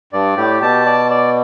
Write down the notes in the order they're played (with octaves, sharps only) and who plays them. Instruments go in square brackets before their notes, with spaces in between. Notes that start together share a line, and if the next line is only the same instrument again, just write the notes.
[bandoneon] G2 [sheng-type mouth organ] D5
[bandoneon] A2 [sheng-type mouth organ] G4
[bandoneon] B2 [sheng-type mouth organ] A5
[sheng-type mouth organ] D5
D5